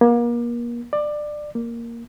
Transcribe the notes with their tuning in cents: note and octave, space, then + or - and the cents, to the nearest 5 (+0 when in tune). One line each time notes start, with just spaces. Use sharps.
A#3 +35
D5 +20
A#3 +0